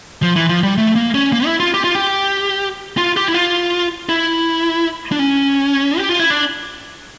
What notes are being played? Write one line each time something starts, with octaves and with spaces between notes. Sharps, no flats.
F3
E3
F3
G3
A3
A#3
C#4
A#3
E4
F4
G4
F4
G4
F4
G4
E4
F4
E4
D4
C#4
G4
F4
E4
D4